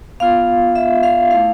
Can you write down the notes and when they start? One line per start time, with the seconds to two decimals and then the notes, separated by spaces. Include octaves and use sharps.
0.20 B3 F4 F5
0.75 E5
1.03 F5
1.31 A3 E4 F5